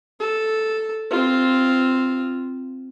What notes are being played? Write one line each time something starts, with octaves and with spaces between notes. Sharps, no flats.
A4
C4 F4